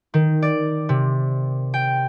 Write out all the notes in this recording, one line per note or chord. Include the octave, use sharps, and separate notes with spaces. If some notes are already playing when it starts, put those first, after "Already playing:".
D#3
D5
C3
G5